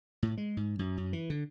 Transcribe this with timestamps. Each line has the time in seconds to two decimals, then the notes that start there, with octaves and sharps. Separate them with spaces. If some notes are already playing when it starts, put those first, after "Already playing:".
0.23 A2
0.37 G#3
0.57 G#2
0.79 F#2
0.98 F#2
1.13 E3
1.30 D3